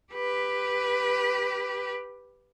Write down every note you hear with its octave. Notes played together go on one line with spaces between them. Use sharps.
G4 B4